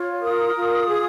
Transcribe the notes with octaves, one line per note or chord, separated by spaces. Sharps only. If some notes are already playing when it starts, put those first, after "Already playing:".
Already playing: F4 C#5
A#4 D#6
F4
G#4